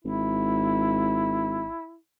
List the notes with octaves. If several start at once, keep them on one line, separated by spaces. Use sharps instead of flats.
G#1 E4